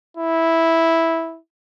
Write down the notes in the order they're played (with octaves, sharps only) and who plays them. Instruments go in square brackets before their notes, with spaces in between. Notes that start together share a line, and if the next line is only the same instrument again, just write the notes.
[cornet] E4